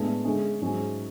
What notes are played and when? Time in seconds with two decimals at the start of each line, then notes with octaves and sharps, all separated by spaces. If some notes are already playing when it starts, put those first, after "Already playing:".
Already playing: A2 G#3 B3 D4 G#4
0.25 D3 G#3 C#4 G#4
0.61 G#2 F#3 C#4 G#4